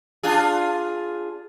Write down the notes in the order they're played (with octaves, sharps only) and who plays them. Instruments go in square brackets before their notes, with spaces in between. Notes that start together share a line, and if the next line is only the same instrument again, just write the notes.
[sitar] D4 F4 G#4